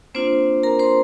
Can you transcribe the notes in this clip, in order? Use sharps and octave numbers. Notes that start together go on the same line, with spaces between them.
A#3 C4 D4 F4 C5
A#4 A#5
C5 C6